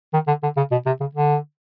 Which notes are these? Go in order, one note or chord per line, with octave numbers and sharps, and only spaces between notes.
D#3
D3
D3
C#3
B2
C3
C#3
D3